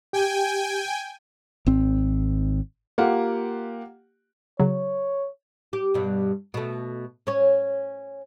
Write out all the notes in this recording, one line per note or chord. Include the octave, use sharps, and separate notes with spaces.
G4 G5 G#5
G#1 C4
A#3 F4 G4 F#5
C#3 F#3 C#5
G4
G2 B2
B2 A3
C#4 C#5